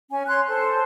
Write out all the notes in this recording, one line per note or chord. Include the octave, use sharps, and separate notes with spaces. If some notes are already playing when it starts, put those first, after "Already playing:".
C#4 G#5
C#5 C6 F#6
A4 C5